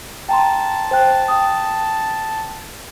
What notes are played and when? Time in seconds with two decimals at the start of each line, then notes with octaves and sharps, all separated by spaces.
0.29 G5 A5 A#5 C6
0.91 C5 G5 F#6
1.28 G5 D#6